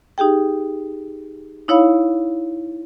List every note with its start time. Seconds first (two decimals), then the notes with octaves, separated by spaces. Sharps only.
0.18 D#4 G4 G#4 G5
1.68 D#4 E4 C#5 F5 B5